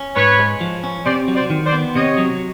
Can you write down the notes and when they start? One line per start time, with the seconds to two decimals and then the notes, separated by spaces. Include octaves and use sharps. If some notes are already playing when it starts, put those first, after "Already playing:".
Already playing: C#4
0.15 G#2 B4 C#5
0.39 G#3
0.61 F3
0.84 C#4
1.05 C3 C5 D5
1.28 F#3
1.35 C5 D5
1.50 D#3
1.66 C5 D5
1.72 B3
1.95 C3 C#5 D#5
2.18 F#3